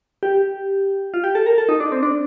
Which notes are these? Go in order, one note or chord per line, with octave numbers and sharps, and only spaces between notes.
G4
F4
G4
A4
A#4
A4
D#4
D4
C4
D4